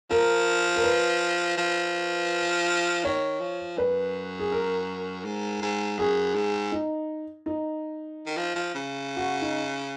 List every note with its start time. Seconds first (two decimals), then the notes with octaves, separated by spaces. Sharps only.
0.10 F3 A#4
0.76 A#4
0.84 B4
1.58 F3
3.04 D#3 C#5
3.41 F3
3.78 F#2 B4
4.39 G#4
4.52 A#4
5.25 G#2
5.62 G#2
5.99 F#2 G#4
6.35 G#2
6.72 D#4
7.46 D#4
8.27 D#3
8.37 F3
8.55 F3
8.75 C#3
9.17 F#4
9.42 D#4